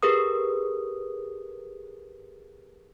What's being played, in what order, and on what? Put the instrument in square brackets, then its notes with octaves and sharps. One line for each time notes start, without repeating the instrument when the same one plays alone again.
[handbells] G4 G#4 A#4 B4 D#6